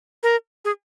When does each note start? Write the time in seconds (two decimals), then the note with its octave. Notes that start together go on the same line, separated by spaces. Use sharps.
0.23 A#4
0.65 G#4